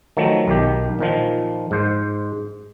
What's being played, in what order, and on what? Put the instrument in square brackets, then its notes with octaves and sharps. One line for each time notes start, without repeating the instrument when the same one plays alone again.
[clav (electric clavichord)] D#3 F3 F#3 A3
B1 D#3 G4
A#2 D#3 F3
G#2 C5